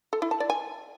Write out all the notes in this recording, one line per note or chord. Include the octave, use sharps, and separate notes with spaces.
A4
E4
A5
D5
G#5